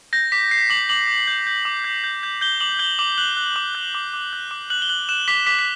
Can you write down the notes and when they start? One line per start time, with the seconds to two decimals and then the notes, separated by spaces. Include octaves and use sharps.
0.13 G6 A#6
0.32 D6 B6
0.51 G6 C7
0.70 D6 F#7
0.89 D6 F#7
1.08 D6
1.27 G6
1.47 G6
1.65 D6
1.84 G6
2.04 G6
2.23 G6
2.41 G6 G7
2.60 D6 F#7
2.79 G6 G7
2.99 D6 F#7
3.18 F#6 F#7
3.37 F#6
3.56 D6
3.75 F#6
3.95 D6
4.13 D6
4.33 F#6
4.51 D6
4.70 F#6 F#7
4.82 G7
4.89 F#6 F#7
5.09 F#6 E7
5.28 D6 B6
5.47 D6 B6
5.59 B6